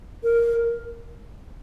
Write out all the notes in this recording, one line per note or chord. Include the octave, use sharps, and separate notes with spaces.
A#4